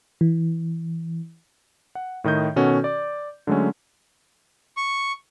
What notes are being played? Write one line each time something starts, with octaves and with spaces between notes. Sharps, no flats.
E3
F#5
A2 D#3 D#5 G6
B2 D#3 C#4 F#4 A4
D5 D6
D3 F#3 G#3 A3 C#4
C#6